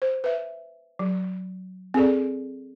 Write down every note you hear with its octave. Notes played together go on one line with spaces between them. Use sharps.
C5
B4 E5
F#3
C4 G#4 A4 D5